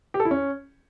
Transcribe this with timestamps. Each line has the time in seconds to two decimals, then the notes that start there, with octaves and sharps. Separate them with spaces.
0.14 G4
0.20 A4
0.25 E4
0.31 C#4